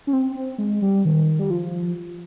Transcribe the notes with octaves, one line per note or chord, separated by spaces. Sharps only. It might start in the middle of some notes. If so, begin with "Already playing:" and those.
C#4
C4
C4
G#3
G3
D#3
G3
F3